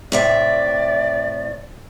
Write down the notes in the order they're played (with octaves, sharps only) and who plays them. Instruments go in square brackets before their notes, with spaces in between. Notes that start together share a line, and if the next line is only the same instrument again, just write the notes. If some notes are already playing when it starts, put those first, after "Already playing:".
[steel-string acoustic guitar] A2 C3 E5 [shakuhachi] D5